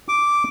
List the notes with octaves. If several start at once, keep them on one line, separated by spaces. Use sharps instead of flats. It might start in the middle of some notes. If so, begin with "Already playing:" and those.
D6